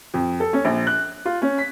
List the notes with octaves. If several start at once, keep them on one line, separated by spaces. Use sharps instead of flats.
F2
A4
C#4
A#1
F#6
F4
C#4
B6